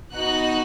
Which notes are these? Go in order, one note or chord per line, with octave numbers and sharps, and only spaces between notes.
B3 D#4 F#4 F#6